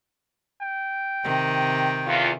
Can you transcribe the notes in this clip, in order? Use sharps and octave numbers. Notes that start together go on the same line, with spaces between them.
G5
C3 D#3
E2 F4